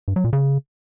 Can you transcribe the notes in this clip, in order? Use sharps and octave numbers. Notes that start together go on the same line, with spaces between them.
G2
F#3
A#2
C#3